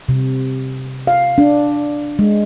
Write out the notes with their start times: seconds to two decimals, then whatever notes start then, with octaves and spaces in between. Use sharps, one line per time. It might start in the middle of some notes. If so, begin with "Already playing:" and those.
0.09 C3
1.07 F5
1.38 D4
2.19 G#3